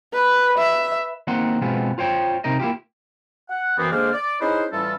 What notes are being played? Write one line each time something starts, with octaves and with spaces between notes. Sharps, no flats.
B4
E5
D#3 A#3 C4 F#5 C6
B2 G#3 B3 C4 F4
F4 C5 C#5 G5
C3 D#4 A#4 D#5
A#3 E4 F4 G4
F#5
F#2 E3 B3 C4
D3 G#3 A#3 C5 D5 F6
D5
C#4 D#4 E4 G#4 B4 C5
A2 E3 G3 C#4 F4 A4